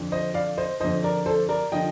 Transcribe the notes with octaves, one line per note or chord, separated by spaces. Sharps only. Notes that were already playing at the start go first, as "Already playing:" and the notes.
Already playing: F2 D3 F3
C5 D#5
D5 F5
C5 D#5
F2 D3 F3 C5 D#5
A#4 D5
A4 C5
A#4 D5
D3 F3 D#5 G5